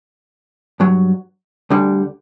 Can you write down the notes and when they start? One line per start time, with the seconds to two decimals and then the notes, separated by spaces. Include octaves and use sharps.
0.80 G2 F#3
1.70 D2 D3 G3